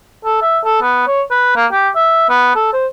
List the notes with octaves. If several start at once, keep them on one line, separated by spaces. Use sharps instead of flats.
A4
E5
A4
B3
C#5
B4
A#3
G4
E5
B3
A4
C5